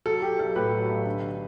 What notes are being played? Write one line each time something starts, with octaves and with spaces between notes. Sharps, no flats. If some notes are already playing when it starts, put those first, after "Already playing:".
F#3 A4
F#3 G4
B1 A4
A2 G4 B4
F#3
B1
D3